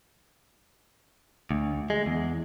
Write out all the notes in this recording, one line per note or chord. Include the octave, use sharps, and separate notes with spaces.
D2
G#3
E2